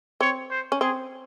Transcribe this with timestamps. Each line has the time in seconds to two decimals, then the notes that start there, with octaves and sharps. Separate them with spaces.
0.21 C4 C#5
0.51 C5
0.72 C#4
0.81 C4 G#4